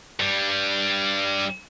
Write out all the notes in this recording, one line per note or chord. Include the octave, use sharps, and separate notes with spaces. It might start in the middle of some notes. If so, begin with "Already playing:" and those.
G2 G3